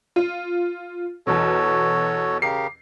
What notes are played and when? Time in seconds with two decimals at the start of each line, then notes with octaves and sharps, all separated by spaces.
0.16 F4
1.27 E2 B2 F#4 A4 C#5
2.42 C#3 G4 A#4 C7